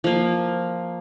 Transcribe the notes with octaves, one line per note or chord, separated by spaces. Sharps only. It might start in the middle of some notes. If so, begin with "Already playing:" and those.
F3 A#3